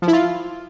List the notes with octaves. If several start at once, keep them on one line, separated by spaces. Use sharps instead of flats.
F3
E4
F4